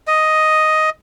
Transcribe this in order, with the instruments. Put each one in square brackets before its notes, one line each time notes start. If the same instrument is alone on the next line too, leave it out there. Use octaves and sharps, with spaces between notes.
[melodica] D#5